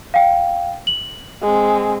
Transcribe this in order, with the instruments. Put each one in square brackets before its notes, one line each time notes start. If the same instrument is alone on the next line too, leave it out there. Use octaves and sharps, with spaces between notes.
[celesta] F5 G5
F#7
[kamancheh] G#3 C4